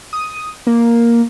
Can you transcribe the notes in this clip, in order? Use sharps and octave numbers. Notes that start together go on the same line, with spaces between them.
D#6
A#3